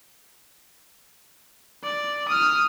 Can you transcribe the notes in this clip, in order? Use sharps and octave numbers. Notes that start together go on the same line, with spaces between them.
D5
D#6 F6